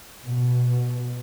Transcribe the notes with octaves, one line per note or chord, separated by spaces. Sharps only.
B2